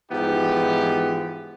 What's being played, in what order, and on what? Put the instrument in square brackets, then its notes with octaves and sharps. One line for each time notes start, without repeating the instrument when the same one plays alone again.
[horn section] G#2 E3 F3 B3 D#4 G4